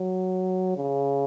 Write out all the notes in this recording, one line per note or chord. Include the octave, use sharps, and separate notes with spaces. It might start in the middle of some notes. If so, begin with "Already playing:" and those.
Already playing: F#3
C#3